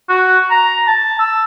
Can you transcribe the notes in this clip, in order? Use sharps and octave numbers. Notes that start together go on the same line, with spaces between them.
F#4
A#5
A5
E6